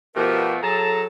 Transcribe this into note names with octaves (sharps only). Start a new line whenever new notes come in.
B2 F3 A3 G4 A#4
F#3 G#4 A4 A5 A#5